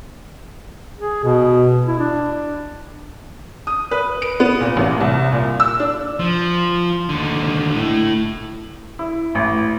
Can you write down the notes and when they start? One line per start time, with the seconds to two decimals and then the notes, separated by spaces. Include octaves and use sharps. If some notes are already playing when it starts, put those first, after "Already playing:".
0.98 G#4
1.24 B2
1.87 E4
1.99 D4
3.67 D#6
3.91 B4
4.22 D7
4.40 B3
4.61 A#2
4.77 A1
5.01 C2
5.32 A#2
5.60 E6
5.79 D4
6.20 F3
7.09 D#2 D3
7.75 A2
8.99 E4
9.35 A1